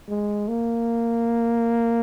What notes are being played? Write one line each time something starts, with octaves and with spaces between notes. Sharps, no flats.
G#3
A#3